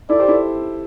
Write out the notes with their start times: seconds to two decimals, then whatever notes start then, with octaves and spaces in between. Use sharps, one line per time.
0.09 E4 A4 D5
0.19 G4 C5
0.28 E4 A4